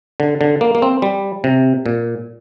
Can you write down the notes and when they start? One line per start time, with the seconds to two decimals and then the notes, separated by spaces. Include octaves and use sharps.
0.20 D3
0.41 D3
0.61 A#3
0.75 A#3
0.82 C4
1.02 G3
1.44 C3
1.86 A#2